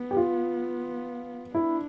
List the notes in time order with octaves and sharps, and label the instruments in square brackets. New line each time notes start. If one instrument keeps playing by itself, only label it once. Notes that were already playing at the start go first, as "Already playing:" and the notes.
Already playing: [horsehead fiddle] B3
[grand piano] G4
F4
[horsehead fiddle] D4 [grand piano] E4